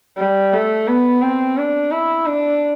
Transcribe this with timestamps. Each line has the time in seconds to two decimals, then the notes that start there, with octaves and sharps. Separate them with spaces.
0.18 G3
0.53 A3
0.88 B3
1.22 C4
1.57 D4
1.91 E4
2.27 D4